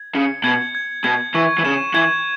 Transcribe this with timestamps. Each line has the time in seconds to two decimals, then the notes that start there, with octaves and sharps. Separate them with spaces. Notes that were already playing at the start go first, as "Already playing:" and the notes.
Already playing: G#6
0.14 C#3 C#7
0.44 B2 G#6
0.75 G#6
1.04 B2 G#6
1.35 E3 C#6
1.59 E3
1.65 C#3 E7
1.94 E3 G#6